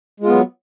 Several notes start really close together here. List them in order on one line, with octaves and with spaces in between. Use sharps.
G#3 F4 B3 F#3